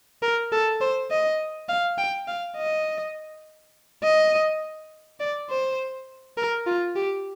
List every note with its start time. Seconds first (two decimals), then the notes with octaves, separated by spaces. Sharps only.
0.22 A#4
0.52 A4
0.81 C5
1.11 D#5
1.69 F5
1.98 G5
2.28 F5
2.57 D#5
4.03 D#5
5.20 D5
5.50 C5
6.37 A#4
6.66 F4
6.96 G4